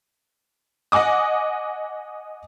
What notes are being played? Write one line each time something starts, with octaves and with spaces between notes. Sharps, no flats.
D#5 F#5 G#5 D6 D#6